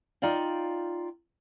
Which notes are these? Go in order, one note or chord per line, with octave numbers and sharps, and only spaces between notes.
D#4 F4 D5 F5 G5